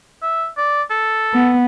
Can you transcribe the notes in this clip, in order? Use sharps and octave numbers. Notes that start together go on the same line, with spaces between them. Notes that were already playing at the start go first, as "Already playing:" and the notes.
E5
D5
A4
B3